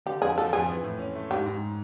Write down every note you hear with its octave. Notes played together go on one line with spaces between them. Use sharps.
D3 G4
F2 G#4
F3 A4
F2 G#4
E3
A2
C#4
A3
G#2 G4
G#2